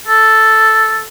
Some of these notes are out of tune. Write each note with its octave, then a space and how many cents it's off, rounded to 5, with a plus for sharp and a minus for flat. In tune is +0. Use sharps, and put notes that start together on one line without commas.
A4 +0